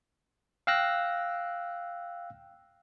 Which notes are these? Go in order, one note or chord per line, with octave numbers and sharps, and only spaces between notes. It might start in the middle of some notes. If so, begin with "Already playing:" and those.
F5 G5 E6 F#6 A#6